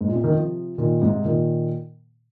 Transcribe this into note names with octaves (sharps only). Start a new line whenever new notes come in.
G#2
A#2
C3
D#3
C3 F3
A#2 D#3
G#2 C3
A#2 D#3